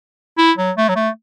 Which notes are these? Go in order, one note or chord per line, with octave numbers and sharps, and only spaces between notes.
E4
F#3
A3
F#3
A3